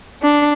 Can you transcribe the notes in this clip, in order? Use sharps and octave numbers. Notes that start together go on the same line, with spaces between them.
D4